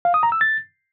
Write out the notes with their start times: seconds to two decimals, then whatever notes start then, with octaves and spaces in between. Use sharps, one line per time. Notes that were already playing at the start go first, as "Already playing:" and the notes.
0.05 F5
0.14 D#6
0.23 A#5
0.32 E6
0.41 A6